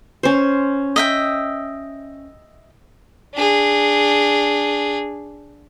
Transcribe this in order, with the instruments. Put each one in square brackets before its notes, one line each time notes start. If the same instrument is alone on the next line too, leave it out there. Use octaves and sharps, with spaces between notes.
[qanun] C#4 C5
[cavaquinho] D#5 E5 G5
[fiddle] D4 G#4